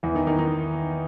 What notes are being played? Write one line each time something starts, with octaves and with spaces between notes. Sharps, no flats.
E2 E3
D#3 D#4
D#3 D#4
D#3 D#4